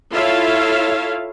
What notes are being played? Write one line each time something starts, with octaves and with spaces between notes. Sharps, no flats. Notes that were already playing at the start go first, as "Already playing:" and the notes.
E4 F4 A4 C#5 E5 F5